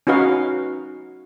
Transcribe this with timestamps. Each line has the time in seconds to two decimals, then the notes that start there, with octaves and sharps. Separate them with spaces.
0.07 C#4 D#4 F#4 B4 F5